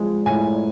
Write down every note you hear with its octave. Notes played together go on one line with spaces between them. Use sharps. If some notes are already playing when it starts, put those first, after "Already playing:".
Already playing: F3 G#3
A2 G#5